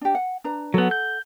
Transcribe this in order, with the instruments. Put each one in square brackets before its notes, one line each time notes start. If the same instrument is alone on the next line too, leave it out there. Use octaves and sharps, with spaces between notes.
[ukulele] D4 G4
F#5
D4 B4 A#5
[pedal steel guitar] F#3 B3 [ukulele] A4 F#5
[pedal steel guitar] G6